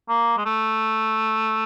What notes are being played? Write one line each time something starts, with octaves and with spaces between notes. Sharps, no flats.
A#3
G#3
A3